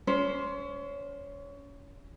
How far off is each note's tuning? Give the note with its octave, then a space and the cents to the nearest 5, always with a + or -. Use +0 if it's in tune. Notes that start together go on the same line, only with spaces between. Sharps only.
C#4 +25 C5 +0